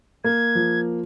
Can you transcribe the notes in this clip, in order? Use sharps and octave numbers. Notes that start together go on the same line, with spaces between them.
A#3 G#6
F3